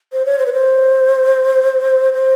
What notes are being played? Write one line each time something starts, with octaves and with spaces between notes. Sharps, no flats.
C5
C#5
C5
B4
C5
C5